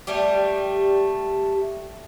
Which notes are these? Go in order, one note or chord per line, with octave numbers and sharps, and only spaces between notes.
G3 A3 G4